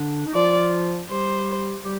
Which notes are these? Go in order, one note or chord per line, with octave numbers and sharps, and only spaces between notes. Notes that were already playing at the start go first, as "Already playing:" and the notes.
Already playing: D3 D4
D#4
F3 F4 D5
G3 G4 C5
G3 G4